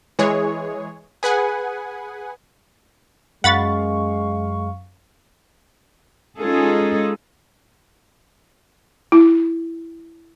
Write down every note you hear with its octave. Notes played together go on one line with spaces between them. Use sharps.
E3 G#3 G#4 C#5
G#4 B4 F#5 G#5
F#2 G#3 F5 F#5 B5 C#6 A6
G#3 C#4 D#4 F4 G#4 A4
E4